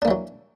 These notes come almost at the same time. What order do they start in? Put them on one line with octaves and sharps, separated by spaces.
D4 A#3 E3 F#3